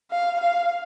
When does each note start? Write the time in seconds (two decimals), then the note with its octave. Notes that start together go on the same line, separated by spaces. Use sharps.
0.11 F5
0.40 F5